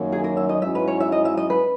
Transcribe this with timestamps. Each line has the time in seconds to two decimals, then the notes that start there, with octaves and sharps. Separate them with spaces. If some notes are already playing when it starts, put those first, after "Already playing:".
Already playing: F#2 D#3 F#3 A#3
0.12 G#4
0.24 A#4
0.37 E5
0.49 D#5
0.62 G#2 F#3 C#4 E4 E5
0.75 B4
0.88 C#5
1.00 E5
1.12 D#5
1.25 E5
1.37 D#5
1.50 B4